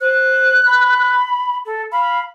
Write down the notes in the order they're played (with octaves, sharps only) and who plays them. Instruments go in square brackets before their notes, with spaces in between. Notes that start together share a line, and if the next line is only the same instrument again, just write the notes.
[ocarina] C5 [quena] F#6
[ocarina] B5
[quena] A4
[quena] F5 [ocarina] B5